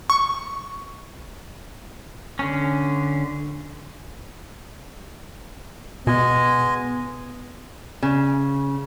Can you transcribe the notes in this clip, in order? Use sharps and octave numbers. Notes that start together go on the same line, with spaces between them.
C#6
D3 C#4
B2 G#3 B3 D#5 G#5
C#3